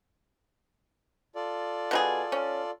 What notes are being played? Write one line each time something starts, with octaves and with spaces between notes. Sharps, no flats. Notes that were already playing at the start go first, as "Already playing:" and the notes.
F4 A4 D5
B2 D#4 G#4
C#4